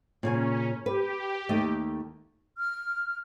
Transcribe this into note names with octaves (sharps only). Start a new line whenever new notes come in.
A#2 C#3 C#4 G#5
G4 B4
D#2 A3 D#5
F6